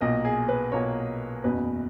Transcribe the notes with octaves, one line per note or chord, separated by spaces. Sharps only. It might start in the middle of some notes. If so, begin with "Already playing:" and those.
B1 A#2 A#3 D#5
G#4
B4
B1 A#2 A#3 C#5
F#1 E2 B2 B4